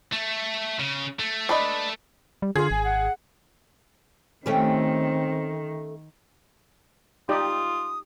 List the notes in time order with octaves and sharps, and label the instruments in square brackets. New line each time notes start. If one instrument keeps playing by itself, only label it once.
[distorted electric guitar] A3
C#3
A3
[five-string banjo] D4 B4 D#5
[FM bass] G3
[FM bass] D3 [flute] F4 [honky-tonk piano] G#4
[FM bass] G#1 [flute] G#5
[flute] F#5
[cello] D#3 [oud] A3 C#4 G4 [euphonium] C4
[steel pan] D#4 G4 D5 [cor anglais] F4 [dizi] D#6